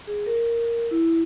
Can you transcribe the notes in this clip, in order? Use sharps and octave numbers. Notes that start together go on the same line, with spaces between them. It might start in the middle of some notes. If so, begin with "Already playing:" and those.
G#4
A#4
E4